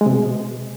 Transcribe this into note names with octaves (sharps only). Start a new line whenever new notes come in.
G#3
C3
B2